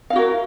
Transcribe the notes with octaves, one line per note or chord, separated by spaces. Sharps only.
E4 F#4 A#4 F5